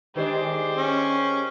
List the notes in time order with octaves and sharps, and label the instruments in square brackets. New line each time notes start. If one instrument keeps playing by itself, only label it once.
[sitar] D#3 G#3 D4 [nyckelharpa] G4 C5
[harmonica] C#4